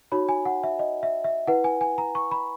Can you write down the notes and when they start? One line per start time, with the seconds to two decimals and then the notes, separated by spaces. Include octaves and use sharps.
0.12 D#4 F#4 C#5 B5
0.29 G#5
0.45 F#5
0.63 E5
0.79 D#5
1.03 E5
1.24 E5
1.47 E4 B4 F#5
1.64 G#5
1.81 G#5
1.98 A#5
2.15 C#6
2.31 B5